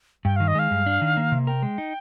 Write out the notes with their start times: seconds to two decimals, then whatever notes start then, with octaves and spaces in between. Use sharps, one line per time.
0.25 G2 G5
0.36 D#3 F5
0.48 D#5
0.55 G#3 F5
0.71 G2
0.86 D4
1.02 D#3
1.17 A#3
1.32 C3
1.47 A#4 G5
1.62 G#3
1.78 D#4